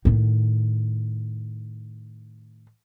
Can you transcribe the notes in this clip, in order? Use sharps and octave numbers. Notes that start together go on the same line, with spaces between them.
A2 D#3